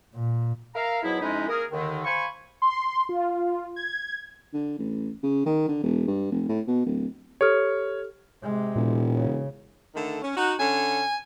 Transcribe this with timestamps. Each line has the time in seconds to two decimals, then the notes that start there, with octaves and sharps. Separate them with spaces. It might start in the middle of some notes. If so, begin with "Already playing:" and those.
0.15 A#2
0.75 A#4 E5 F5 A#5
1.03 G#2 B2 F#3 B3 E4
1.21 F2 C3 G#3 C#4 D#4 E4
1.48 A#3 G#4 A#4
1.71 D#2 D3 D#3
2.04 C5 F5 G#5 B5 C#6
2.62 C6
3.09 F4
3.76 G#6
4.53 D3
4.79 A1
5.23 C#3
5.46 D#3
5.68 D3
5.83 E1
6.07 G2
6.31 F1
6.49 A2
6.68 B2
6.86 D1
7.41 G4 A4 C#5 F6
8.43 C3 G#3
8.76 E1 A#2
9.15 C#3
9.95 D3 D#3 A3
10.22 C#4
10.36 D#4 F#4
10.60 D3 C#4 G#5